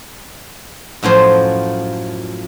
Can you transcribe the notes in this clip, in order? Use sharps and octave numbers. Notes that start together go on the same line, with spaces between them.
F#2 A2 F3 C5